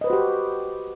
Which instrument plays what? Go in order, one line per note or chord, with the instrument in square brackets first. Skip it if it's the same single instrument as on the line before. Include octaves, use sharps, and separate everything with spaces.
[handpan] D#5
B4
C5
F#4
G4